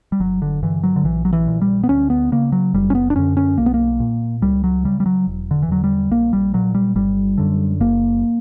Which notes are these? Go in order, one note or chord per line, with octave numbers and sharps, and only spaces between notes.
G3
G1 F#3
D3
G2 D3 E3
F#3
D3
A#1 E3
F#3
E3
A#2
G3
B3
D2 C#4
B3
C#3 A#3
F#3
F#1 G3
C#4
B3
D4
F#2 D3 C#4
C#4
B1 A#3
B3
A#3
A#2
C#2 G3
F#3
C#3 G3
G3
F#3
E1
D3
E3
E2 D3 F#3
G3
A#1 A#3
G3
A#2 F#3
G3
G1 G3
F#2 D3
F#1 A#3